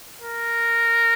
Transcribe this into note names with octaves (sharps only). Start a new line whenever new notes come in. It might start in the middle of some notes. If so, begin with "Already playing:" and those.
A#4